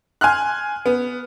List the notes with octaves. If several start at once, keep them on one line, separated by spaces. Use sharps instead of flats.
G#5 C6 F6 F#6
B3